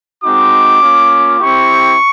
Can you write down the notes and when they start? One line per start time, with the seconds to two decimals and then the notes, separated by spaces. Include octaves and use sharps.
0.24 G#3 C4 D#4 F#4 D6
0.82 A#3 C#4 F4
1.40 C4 E4 G4 C#6